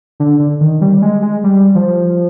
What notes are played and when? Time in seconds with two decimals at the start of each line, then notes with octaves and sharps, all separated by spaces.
0.20 D3
0.39 D3
0.61 D#3
0.81 G3
1.02 G#3
1.22 G#3
1.44 G3
1.75 F3